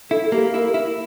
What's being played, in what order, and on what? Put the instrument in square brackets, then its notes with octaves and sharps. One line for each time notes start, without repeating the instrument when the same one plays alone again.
[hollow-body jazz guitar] E4 [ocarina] A4
[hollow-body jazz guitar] A#3 [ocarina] G4
[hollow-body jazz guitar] E4 [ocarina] A#4
[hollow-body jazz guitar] E4